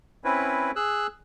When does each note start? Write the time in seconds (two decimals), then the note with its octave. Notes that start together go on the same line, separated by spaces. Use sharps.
0.24 C4 C#4 E4 B4
0.76 G#4 E6 F#6